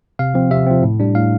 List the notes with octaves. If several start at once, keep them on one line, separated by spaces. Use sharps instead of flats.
C3 F5
F3 C4
C3 E5
F3 C4
A2
G3 D4
A2 F5